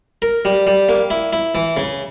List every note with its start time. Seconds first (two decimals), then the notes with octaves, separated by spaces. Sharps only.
0.22 A#4
0.45 G3
0.67 G3
0.89 A#3
1.10 E4
1.33 E4
1.55 E3
1.77 C#3